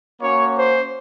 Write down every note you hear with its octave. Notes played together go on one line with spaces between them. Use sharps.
A#3 C#4 F#4 C#5
C5